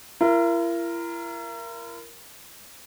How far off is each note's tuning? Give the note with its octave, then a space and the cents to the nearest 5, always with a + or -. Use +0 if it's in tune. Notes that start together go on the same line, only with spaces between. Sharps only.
E4 +45 A#4 +0